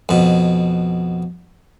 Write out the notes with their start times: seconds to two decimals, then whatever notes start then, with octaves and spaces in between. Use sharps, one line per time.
0.09 F2 B2